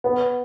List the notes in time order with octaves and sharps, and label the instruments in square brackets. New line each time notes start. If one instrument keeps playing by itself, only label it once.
[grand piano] B3